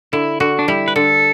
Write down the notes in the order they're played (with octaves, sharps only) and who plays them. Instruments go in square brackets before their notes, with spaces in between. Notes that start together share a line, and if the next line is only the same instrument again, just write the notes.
[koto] D3 [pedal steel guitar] E4
[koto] D3 [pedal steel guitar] F#4
[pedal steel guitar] D4
[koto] G3 [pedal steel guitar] E4
[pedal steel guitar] B4
[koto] D3 [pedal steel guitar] A4